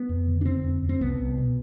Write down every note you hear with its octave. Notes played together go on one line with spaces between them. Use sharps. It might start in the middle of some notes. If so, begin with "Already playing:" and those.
Already playing: B3
F2
D3
D4
D3 C4
F2
F2
C4
C2 B3
C2
B2